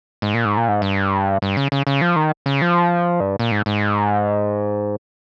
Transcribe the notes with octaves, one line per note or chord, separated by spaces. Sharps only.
G#2
A#2
G#2
A#2
G#2
G2
G2
C#3
C#3
C#3
F3
D#3
C#3
F3
G2
A#2
G#2
G#2